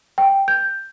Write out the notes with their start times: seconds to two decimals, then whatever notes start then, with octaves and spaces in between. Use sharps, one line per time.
0.18 G5
0.48 G6